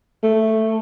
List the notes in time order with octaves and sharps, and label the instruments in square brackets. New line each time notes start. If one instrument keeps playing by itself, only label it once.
[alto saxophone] A3